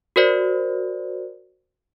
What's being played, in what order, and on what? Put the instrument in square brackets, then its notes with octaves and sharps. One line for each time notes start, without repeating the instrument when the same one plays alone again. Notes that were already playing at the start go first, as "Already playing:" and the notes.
[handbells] F#4 A#4 C5 D5